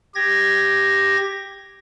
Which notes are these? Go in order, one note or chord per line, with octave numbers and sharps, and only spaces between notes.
G4 G#6 A#6